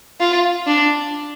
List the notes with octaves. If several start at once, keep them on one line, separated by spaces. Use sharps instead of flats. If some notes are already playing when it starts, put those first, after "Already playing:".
F4
D4